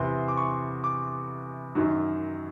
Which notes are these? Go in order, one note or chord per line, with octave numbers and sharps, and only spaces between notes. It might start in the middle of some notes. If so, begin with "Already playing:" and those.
Already playing: E2 C3 E3 C6
D6
C#6
D6
F#2 D#3 F#3